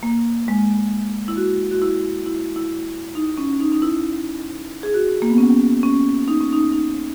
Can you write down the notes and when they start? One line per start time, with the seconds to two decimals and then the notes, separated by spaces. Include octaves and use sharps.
0.03 A#3
0.48 G#3
1.28 E4
1.37 F#4
1.71 F#4
1.82 E4
2.26 E4
2.56 E4
3.15 D#4
3.38 C#4
3.61 D#4
3.72 D#4
3.82 E4
4.83 G#4
4.94 F#4
5.22 A#3
5.30 B3
5.38 C#4
5.83 C#4
6.28 D#4
6.40 C#4
6.53 D#4
6.72 D#4